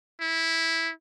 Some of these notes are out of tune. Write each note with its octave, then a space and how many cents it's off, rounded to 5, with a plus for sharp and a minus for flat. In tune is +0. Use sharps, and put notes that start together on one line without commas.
E4 -10